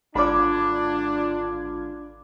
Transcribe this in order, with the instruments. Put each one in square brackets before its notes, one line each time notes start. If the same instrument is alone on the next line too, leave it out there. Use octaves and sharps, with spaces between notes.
[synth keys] G#1 F4 G#6 [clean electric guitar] D3 [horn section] D4 [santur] D5 B5